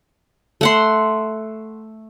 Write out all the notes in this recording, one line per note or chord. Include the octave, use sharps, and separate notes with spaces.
A3 F#5 C6